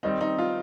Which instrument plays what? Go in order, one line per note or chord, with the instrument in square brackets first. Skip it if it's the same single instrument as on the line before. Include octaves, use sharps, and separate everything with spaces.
[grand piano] D#3 G3 C4 [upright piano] D#4
[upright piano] D#4
F4